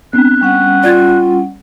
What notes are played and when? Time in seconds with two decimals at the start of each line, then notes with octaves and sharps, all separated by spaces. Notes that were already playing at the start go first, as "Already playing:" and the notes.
0.13 B3 C4 D4 F#6
0.41 G3 C#4 F#5
0.83 F4 D5 G#6 A6